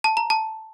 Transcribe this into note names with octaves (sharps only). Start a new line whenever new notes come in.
A5
A#5
A5